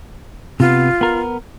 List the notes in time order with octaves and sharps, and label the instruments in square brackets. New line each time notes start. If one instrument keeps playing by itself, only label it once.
[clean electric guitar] C3 B3 [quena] F4
[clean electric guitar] B3 A#4